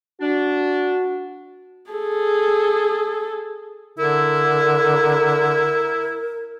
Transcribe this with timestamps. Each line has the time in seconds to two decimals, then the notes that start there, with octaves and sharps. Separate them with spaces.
0.21 D4 F#4
1.91 G#4 A4
3.98 D3 E4 A#4